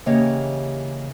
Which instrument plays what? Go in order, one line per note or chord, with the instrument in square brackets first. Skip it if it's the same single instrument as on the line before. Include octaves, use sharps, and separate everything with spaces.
[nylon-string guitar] C#3 E3 A#3 G4 C#5 D#5